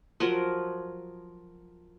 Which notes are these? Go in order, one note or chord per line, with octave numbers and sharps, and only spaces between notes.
F3 F#3 A#4